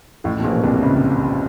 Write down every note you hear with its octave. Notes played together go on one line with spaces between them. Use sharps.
A1 A2
B2
A#1 A#2
C2 C3
C#2 C#3